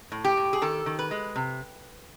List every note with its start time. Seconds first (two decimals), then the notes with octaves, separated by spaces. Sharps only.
0.12 A2
0.25 G4
0.37 A2
0.53 G#4
0.62 D#3 A4
0.86 D#3
0.99 B4
1.11 G#3
1.36 C3